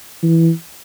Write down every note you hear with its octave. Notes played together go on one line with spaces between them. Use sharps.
E3